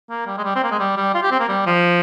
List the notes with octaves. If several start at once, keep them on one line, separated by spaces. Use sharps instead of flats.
A#3
G3
G#3
G3
C4
A#3
G#3
G3
G3
F4
G4
C4
A#3
G3
F3